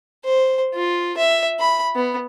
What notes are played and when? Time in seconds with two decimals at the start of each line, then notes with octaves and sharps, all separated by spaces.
0.25 C5
0.75 F4
1.18 E5
1.60 B5
1.96 B3